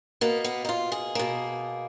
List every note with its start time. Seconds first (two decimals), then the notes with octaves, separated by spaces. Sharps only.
0.21 B2 A#3 B3
0.45 B3
0.65 D#4
0.69 F4
0.92 G#4
1.15 B2 A#3